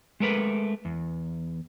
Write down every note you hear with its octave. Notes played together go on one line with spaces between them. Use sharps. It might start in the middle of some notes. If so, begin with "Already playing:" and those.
G#3 A3 A#4 B4
E2